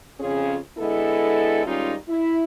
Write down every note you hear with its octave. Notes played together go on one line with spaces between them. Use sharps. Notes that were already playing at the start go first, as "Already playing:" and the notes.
F2 C#3 C4 C#4 F4 G#4
D3 G#3 B3 E4 A4
D#3 G3 G#3 C#4 D#4 F4
E4